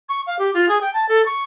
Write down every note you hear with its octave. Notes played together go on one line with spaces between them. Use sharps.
C#6
F5
G4
F4
G#4
G5
A5
A4
C#6